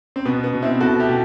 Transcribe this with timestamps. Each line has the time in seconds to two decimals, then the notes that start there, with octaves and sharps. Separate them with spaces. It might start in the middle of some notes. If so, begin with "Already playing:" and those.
0.16 C4
0.25 B2 B3
0.44 B3
0.53 B2
0.62 C4 E4
0.81 B2 F#4 A4
0.99 E4 G4
1.09 B2